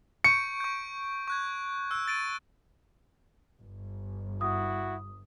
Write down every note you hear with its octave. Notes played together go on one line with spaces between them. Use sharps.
C#6 G6 C#7 D7
C#6 G6
C#6 F#6 G#6
E6 F#6
A6 D7 D#7
G1
E4 F#4 D#6